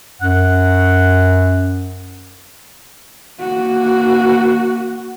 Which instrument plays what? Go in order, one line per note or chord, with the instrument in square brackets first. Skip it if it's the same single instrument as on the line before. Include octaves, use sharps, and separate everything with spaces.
[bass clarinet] F#2 [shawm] F#5
[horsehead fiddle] A#3 F#4